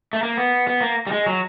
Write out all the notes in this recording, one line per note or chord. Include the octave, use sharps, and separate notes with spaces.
A3
A#3
B3
B3
A#3
G3
G#3
F#3